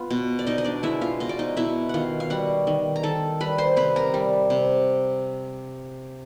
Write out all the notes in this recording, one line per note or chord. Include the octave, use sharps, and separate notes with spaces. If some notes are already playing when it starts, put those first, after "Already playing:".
Already playing: B3 F4
B2
D5
B2 D#4 D#5
D#5
D4 D5
G#3 E4 E5
F4 F5
B2 D#5
D5
D#4 D#5
B2 E4 E5
D#3 F4 F5 F#5
F5
G3 F#4 F#5
D#3
A#5
D#3 A4 A5
G3 B4 B5
C5 C6
C3 B4 B5
A#4 A#5
G3
C3